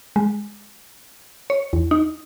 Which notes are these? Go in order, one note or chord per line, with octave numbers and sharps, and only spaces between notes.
G#3
C#5
E2
D#4